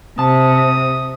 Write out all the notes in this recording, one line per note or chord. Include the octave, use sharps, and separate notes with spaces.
C3 A5 D#6